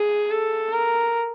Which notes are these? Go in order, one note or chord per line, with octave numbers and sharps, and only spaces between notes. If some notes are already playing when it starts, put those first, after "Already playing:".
Already playing: G#4
A4
A#4